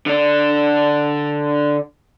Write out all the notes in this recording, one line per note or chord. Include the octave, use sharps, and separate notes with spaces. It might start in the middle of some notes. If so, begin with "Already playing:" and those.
D3 D4